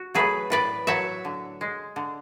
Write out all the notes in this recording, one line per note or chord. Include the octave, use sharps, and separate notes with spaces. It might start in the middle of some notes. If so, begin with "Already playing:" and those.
Already playing: F#4 E5
F#3 A3 G#4 B4
A2 B4 D5
F#3 A3 C#5 E5
D3
G#3
D3